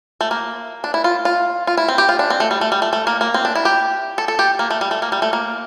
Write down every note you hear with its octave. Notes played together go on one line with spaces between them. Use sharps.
A3
A#3
D4
E4
F4
F4
F4
E4
C4
G4
F4
D4
C4
A3
G3
A3
G3
A3
A3
A#3
A#3
C4
D4
E4
G4
A4
A4
G4
A#3
A3
G3
A3
A#3
G3
A3
A#3